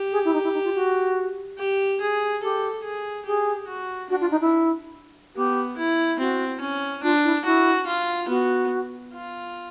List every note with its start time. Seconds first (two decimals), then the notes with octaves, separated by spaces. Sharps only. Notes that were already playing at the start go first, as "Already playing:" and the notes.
Already playing: G4
0.12 G#4
0.24 E4
0.33 D#4
0.43 E4
0.54 D#4
0.64 F4
0.75 F#4
1.58 G4
2.01 G#4
2.42 G4 A4
2.84 G#4
3.25 G4 G#4
3.68 F#4
4.10 D4 F#4
4.20 F4
4.31 D#4
4.41 E4
5.35 B3 G4
5.77 E4
6.19 C4 F#4
6.61 C#4
7.03 D4 F4
7.24 E4
7.45 E4 F#4
7.86 F4
8.28 B3 F#4
9.13 F4